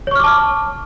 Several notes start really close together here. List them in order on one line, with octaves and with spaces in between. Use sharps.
C#5 C#6 F6 D6 A5